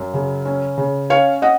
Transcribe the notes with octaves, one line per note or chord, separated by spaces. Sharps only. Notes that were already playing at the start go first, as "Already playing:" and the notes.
Already playing: F#2
C#3
C#4
C#3
C#4 C#5 F5
D#5 F#5